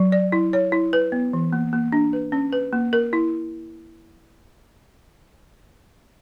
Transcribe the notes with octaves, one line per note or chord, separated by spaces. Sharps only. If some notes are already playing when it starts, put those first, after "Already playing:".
Already playing: F#3
D5
E4
C#5
E4
B4
B3
E3
A#3
A#3
D4
B4
C#4
B4
A#3
A#4
E4